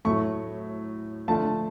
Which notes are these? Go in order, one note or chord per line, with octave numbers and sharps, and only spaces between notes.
A2 F#3 A3 C#6
D3 F3 A3 A5